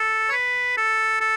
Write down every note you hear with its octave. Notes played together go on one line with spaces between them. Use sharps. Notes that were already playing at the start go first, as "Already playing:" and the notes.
Already playing: A4
C#5
B4
A4
A4